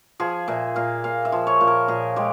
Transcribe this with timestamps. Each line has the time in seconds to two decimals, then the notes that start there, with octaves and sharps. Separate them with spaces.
0.20 F3 G#4
0.48 A#2 E5
0.76 A#2 F5
1.04 A#2 F5
1.25 E5
1.32 F3
1.47 C#5
1.61 A#2
1.67 A#4
1.88 A#2 G#4
2.16 G#3 G4